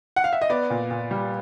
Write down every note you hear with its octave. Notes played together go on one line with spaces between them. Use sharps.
F#5
F5
E5
D#5
B3 D5
A#2
A#2
G3